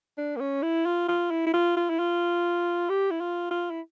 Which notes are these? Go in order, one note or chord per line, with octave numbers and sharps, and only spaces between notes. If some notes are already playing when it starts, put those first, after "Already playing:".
D4
A#3
C#4
E4
F4
F4
E4
E4
F4
F4
E4
F4
G4
E4
F4
F4
E4